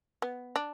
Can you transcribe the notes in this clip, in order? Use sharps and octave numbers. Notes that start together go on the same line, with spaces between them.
B3
D4